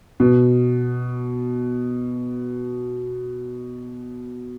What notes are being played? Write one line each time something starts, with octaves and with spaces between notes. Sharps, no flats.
B2